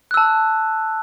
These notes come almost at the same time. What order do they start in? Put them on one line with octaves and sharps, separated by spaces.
F#6 E6 A5